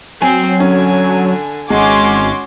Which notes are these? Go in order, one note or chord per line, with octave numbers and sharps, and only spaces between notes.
F#3 C4 G#5
D3 C#4 G#5
G#1 G#3 C#4 F#4 G#5 C6 D6